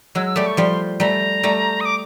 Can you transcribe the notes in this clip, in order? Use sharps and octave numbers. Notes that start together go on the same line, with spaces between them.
F#3 G#3 E6
E6
G3 A3 D6
C#6
F3 G3 C6
G3 A3 A#5
G3 A3
D#6
D6